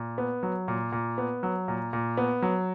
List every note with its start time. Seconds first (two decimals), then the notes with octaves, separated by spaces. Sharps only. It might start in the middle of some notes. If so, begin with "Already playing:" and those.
Already playing: A#2
0.18 B3
0.43 F#3
0.68 A#2
0.92 A#2
1.18 B3
1.43 F#3
1.68 A#2
1.93 A#2
2.17 B3
2.42 F#3